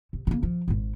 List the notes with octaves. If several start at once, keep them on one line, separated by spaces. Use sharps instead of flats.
C3
C#3 A#3
F3
G#1 G#2